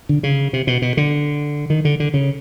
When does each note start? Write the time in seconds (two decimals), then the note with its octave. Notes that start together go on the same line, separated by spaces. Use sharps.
0.09 D3
0.23 C#3
0.53 C3
0.67 B2
0.82 B2
0.97 D3
1.70 D#3
1.85 D3
2.00 D3
2.14 C#3